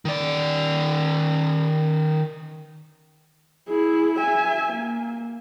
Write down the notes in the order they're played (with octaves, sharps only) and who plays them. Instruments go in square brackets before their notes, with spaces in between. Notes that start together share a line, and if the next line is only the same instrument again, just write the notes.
[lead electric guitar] D#3 D5
[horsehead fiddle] E4 G#4
E5 G#5
A#3